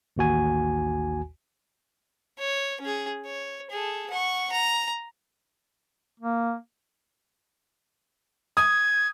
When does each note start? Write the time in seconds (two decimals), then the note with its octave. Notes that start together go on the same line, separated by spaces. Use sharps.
0.17 A1 D#2 F#4 G#5
2.39 C#5
2.81 C#4 G#4
3.26 C#5
3.71 G#4 A4
4.10 F#5 C#6
4.52 A#5
6.20 A#3
8.57 D#6 G#6